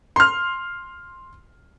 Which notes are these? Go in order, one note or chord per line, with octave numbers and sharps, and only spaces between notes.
C6 F6